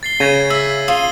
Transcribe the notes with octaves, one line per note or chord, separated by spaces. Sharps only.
A6 C7 G7
C#3 C#6 G#6 D#7
E5 E6 B6
F4 D#6 D#7 G7